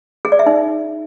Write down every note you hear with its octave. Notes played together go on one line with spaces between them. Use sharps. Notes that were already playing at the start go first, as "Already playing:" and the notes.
G#4
D5
E5
D#4